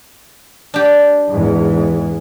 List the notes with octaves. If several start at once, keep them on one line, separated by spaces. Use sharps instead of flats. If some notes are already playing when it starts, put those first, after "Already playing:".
D4 G4
E2 G#2